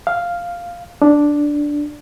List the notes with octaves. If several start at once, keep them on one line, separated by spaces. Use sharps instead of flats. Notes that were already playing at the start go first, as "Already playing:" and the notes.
F5
D4